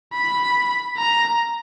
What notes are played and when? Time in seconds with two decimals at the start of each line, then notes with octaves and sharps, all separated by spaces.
0.14 B5
0.97 A#5